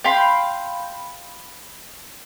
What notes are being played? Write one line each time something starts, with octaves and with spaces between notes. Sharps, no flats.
F5 G5 B5 C6